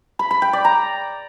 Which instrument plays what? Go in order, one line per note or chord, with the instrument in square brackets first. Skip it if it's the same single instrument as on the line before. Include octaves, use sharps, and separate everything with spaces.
[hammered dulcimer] B5
B5
G5
D5
A#5